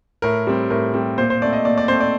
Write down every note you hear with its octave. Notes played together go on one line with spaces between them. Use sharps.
A2 A#4
G3 C4
A2 A#4
G3 C4
A#2 C5
C5
A3 C4 D5
D#5
A#2 D5
D5
A3 C4 C5
D5